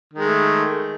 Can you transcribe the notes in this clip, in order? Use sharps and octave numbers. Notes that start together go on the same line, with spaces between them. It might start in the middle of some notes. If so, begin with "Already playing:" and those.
D#3 G#3 A3